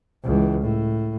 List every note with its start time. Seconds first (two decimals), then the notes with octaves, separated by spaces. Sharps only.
0.24 C#2 E3
0.61 A2